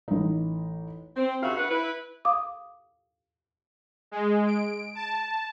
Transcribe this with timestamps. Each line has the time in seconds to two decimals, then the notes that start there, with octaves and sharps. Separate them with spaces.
0.08 A1 D#4
1.17 C4
1.42 D#2 C#3 F4 F#4 E5 F5
1.58 D4 B4 F#5
1.70 E4 B4
2.25 F5 D6 D#6
4.11 G#3
4.46 D7
4.95 A5